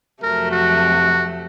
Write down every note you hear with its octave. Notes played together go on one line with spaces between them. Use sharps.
F2 C3 F#3 A3 A#4
F#4